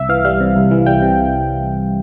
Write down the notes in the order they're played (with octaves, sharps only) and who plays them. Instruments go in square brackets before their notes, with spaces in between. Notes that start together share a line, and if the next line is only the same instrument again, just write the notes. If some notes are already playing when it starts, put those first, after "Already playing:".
Already playing: [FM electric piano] C2 E5
E3 F5
G3 F5
C3
C2
E3
G3 G5
C3